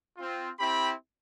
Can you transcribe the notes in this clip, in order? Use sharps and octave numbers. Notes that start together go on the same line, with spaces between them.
C4 F4
C4 E4 G4 B5